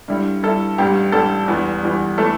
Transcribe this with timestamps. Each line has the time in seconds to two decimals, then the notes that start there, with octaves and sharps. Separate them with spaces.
0.08 G2 D3 G3 E4
0.43 G2 D3 G3 E4 A4
0.78 A1 G2 G3 G4
1.12 A1 G2 G3 A4
1.48 E2 E3 G3
1.83 E2 E3 G3
2.18 E3 A3 E4 A4